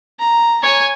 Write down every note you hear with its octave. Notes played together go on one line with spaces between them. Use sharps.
A#5
C#5 G#5